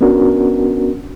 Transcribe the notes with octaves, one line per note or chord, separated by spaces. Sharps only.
B3 C#4 D4 F#4 A#4